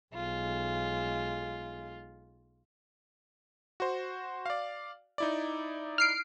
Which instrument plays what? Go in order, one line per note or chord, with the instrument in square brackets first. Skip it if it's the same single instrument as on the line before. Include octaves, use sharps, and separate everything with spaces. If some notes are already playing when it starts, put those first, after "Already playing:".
[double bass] B1 G#3 [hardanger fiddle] F4
[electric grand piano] F#4 C5
D5 F5
D#4 E4 D5
[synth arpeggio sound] F6 C7 D7